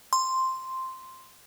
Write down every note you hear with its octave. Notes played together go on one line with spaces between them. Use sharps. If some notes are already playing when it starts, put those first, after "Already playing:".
C6